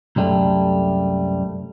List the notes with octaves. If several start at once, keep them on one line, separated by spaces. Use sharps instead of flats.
C2 F#2 G3 A3